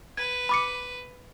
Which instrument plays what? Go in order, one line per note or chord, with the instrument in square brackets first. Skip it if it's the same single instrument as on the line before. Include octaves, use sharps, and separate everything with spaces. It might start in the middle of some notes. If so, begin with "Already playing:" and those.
[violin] B4 [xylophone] G#6
[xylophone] B5 D6 C#7